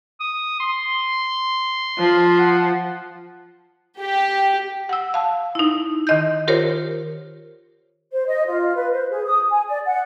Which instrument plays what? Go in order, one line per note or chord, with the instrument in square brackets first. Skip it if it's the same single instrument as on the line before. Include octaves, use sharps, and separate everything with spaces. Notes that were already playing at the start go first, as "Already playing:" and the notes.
[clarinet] D#6
C6
[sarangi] F3
[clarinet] F#5
[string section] G4
[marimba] F#5 E6
F5 A5
D#4 E4
D#3 D#5 G6
F4 G4 A#4 C5 C#5
[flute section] C5
D#5
F4
B4
C5
G#4
D#6
G#5
D5
F#5